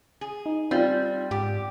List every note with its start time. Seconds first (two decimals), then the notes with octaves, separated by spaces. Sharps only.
0.21 G#4
0.46 D#4
0.71 G3 C4 F4
1.31 G#2 G4